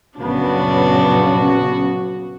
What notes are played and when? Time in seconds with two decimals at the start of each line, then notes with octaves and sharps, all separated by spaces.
0.18 A#1 F#2 C#3 B3 D4 F#4